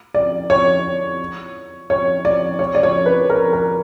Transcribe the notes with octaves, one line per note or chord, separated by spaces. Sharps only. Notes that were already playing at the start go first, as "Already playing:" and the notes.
D5
C#5
C#5
D5
C#5
D5
C#5
B4
A#4
A#4